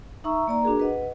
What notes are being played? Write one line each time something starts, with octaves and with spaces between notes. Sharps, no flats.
D#4 E5 A#5 C#6 E6
A#3 D5 A#5
D4 F#4 G#4 A#4
B4 D#5 F#5